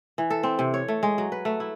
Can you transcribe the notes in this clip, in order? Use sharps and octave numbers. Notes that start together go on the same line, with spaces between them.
E3
A4
C4
C3
C#5
A3
G#3
F#3
B4
A3
E4